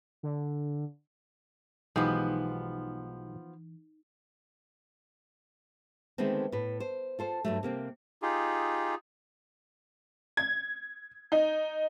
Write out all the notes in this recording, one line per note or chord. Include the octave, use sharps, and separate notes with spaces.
D3
B1 E3 F3 G#3 B3 D#4 G4
D3 D#3 G#3 A3 B3 C4
A2 B4
C5
F4 A4 C5
G2 F#3 A3
C3 A#3 C4
D#4 F4 G4 G#4
G#6
D#4